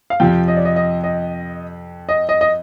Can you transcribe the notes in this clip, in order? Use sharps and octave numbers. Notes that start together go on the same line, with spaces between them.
F5
F2 C3 F3 G5
D#5
D5
D#5
D#5
D#5
D#5
D#5
D#5